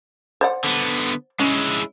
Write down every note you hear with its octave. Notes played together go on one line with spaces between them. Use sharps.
C5 D5 F#5
D3 B3
G#3 C#4 E4